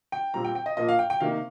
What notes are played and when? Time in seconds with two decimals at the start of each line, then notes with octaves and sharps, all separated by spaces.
0.12 G5
0.34 A#2 G3 C4 A#5
0.45 G5
0.55 G5
0.66 D#5
0.77 A#2 F3 A#3 D#5
0.89 F5
0.99 G5
1.10 G5
1.20 C3 D#3 A#3 F5